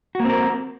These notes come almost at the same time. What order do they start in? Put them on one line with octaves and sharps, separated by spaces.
F#4 A#3 C4 A#4